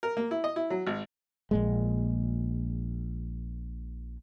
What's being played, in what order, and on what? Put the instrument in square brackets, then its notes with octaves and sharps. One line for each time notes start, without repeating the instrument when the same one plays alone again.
[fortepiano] A#4
A#3
E4
D#5
E4
F#3
G#1
[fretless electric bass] A#1 A#2 G#3